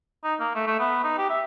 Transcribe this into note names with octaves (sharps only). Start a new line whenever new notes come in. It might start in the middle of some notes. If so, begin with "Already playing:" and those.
D#4
A#3
A3
A3
B3
D#4
G4
E5